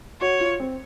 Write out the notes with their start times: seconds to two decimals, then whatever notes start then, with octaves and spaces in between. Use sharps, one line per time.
0.21 F#4 C#5
0.40 F4
0.60 C4